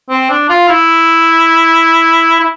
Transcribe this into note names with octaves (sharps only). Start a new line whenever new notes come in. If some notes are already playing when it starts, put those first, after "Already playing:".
C4
D4
F4
E4
E4